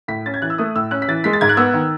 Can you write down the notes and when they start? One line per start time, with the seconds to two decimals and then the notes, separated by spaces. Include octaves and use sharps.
0.08 A2 B6
0.26 C#4 A6
0.34 G#6
0.42 E3 F#6
0.50 E6
0.58 A3 D#6
0.75 A2 E6
0.91 C#4 F#6
1.02 B6
1.08 E3 A6
1.24 G#3 B6
1.33 A6
1.41 G#2 G#6
1.49 F#6
1.57 B3 E6
1.74 D#3